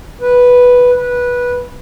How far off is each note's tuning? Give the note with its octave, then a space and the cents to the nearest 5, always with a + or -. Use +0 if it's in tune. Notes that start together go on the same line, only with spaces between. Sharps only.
B4 -5
B4 -15